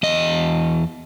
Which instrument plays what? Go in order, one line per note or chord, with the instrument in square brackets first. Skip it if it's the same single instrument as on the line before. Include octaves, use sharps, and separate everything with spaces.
[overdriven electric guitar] E2 D#5